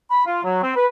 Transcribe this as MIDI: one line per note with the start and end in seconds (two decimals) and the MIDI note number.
0.10 0.23 83
0.25 0.39 65
0.44 0.62 54
0.62 0.72 60
0.75 0.86 71